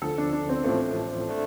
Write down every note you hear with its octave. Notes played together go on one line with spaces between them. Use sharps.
D2 D3 F3 A4
D4
D4
C4
A1 A2 F3 A3 C4
A3 D4